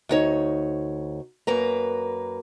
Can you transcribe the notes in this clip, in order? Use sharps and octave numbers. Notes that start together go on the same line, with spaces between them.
D2 D#4 C#5
F#2 A#3 B4 A#5